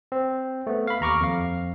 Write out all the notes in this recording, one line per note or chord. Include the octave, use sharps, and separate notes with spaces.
C4
A3 B3
F5 B5
D#2 A#5 C#6 D6 F6
F2 F5